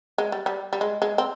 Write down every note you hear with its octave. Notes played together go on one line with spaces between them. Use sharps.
G#3
G3
G3
G3
G#3
G#3
C4